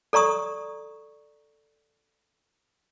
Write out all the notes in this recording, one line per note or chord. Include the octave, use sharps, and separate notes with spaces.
A4 D5 A#5 C#6 D#6